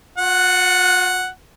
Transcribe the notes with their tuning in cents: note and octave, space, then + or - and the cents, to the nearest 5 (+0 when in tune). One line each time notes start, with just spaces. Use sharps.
F4 +45 F#5 +0